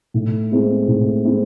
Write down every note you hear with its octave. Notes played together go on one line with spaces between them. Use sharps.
A2
G#3 C4 E4
A2
G#3 C4 E4